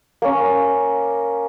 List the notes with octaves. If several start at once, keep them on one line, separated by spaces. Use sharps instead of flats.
A#3 C#4